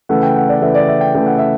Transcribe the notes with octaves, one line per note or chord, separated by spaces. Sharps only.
C#3 E3 A3 F#5
G5
F#5
D5
C#3 E3 A3 E5
D5
E5
G5
C#3 E3 A3 G5
F#5
E5